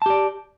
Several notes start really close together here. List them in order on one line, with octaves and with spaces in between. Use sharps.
A5 G4 D5